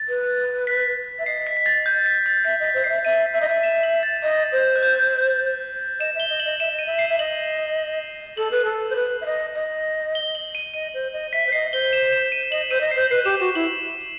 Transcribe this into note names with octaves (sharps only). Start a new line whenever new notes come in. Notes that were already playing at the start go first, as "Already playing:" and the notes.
Already playing: A6
B4
B6
E5
D#5 C7
B6
B6
A6
G6
B6
A6
E5 B6
D#5 B6
C5
D#5 E5 C7
E5 D#7
E5
D#5
E5
E7
F#7
A6
D#5
C5
F#6
G6
D#5 E7
E5 G7
D#5
F#7
D#5
E5 E7
D#5
D#7
E5
C7
E5
D#5 F#7
A4 F#7
B4
A4
C5
B4
E5
D#5
D#5
G7
F#7
D#7
D#5 D#7
C5
D#5
E5 B6
C5
D#5 C7
C5 G7
E7
E7
D#7
D#5 F#7
C5 D#7
D#5
C5 C7
B4 C7
G4 E7
F#4 E7
E4 F#7